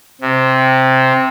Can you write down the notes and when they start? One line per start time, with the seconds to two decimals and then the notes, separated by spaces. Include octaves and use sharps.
0.21 C3